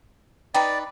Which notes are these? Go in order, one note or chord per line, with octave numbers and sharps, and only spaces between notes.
D#4 B4 D5 G5